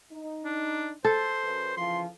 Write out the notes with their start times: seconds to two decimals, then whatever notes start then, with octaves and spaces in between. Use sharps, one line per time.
0.12 D#4
0.45 D4
1.05 A4 C5
1.43 F#2 B4
1.77 C#3 E3 F3 C6